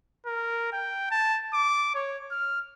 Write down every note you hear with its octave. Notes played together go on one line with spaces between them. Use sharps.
A#4
G5
A5
D6
C#5
F6